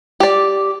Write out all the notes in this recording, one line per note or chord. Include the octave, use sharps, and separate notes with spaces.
G4 D5